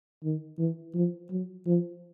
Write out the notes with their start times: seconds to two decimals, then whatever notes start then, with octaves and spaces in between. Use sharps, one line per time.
0.24 D#3
0.59 E3
0.95 F3
1.30 F#3
1.67 F3